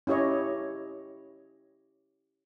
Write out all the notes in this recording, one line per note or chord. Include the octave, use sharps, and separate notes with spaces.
C#4 E4 G4 C#5 D#5